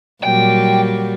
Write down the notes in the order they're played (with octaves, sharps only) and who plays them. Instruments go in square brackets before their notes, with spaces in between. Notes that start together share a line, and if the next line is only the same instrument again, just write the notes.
[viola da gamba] A#2 F#3 G3 [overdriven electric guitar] G5